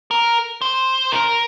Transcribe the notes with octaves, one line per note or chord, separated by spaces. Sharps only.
A#4
C5
A#4